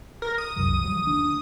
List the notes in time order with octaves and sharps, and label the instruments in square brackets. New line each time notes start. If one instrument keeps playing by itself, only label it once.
[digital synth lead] A#4
D#6
[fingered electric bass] C2 F#2
F3 G3
D2 D4